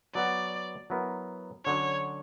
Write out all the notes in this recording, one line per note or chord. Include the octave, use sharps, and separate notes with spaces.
F#3 B3 F#4 D5
F#3 B3 E4 A#4
D3 F#3 C#4 C#5